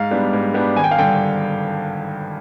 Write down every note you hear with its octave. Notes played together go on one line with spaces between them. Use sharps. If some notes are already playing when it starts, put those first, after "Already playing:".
Already playing: G#2 F5
G3 B3 D4
G#2
G3 B3 D4
G#1 G#5
G5
F5
G2 D3 G5